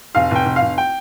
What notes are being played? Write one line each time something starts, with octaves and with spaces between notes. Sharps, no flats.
F1 F5
F1 G5
F1
F5
F1
G5